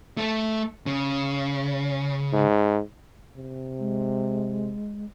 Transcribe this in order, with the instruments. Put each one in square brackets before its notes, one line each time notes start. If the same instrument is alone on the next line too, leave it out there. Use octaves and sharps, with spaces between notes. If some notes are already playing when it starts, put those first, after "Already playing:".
[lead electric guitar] A3 A4
C#3
[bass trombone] G#2
C3
[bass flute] G#3